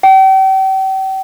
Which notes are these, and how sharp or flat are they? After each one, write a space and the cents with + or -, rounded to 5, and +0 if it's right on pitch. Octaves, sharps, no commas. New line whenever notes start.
G5 -40